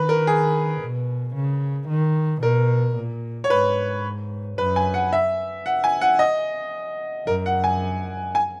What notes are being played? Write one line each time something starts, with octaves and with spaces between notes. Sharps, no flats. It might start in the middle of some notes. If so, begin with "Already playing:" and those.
Already playing: D#3 B4
A#4
G#4
B2
C#3
D#3
B2 A#4
A#2
C#5
G#2 B4
F#2 B4
G#5
F#5
E5
F#5
G#5
F#5
D#5
F#2 A#4
F#5
G#5
G#5